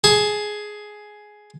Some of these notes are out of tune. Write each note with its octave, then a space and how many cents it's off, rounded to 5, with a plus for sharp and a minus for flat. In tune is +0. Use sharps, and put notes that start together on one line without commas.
G#4 +10 A5 +0